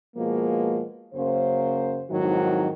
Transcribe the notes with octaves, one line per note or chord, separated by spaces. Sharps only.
B2 F3 G#3 A#3
F#2 C#3 A#3 C5
F2 G#2 D#3 F#3 E4 F#4